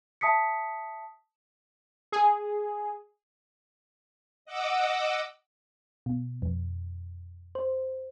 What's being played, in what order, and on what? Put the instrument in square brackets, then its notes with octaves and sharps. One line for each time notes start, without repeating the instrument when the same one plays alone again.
[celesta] E5 A5 D#6 B6 C#7
[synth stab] G#4
[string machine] D#5 F#5 D6 E6
[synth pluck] B2
F2
C5